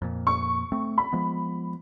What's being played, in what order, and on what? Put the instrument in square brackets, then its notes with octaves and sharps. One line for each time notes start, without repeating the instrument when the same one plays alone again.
[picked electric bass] F2 A#2
[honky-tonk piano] C#6
[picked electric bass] A3 C4
[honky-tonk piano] B5
[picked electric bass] F3 G#3 B3